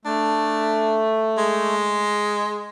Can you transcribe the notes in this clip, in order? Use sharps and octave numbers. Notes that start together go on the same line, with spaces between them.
A3 D4
G#3